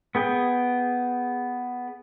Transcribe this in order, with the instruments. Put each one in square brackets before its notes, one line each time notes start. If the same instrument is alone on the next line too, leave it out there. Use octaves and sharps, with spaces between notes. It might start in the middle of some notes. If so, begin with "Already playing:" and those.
[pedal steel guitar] B3 G#4 G5